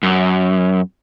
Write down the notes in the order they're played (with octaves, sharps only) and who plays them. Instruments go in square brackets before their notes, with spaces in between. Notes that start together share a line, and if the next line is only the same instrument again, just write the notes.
[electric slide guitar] F#2